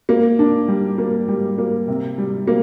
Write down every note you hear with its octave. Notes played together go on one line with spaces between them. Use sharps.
A#3
D4
G3
A#3
G3
A#3
C3
G3
A#3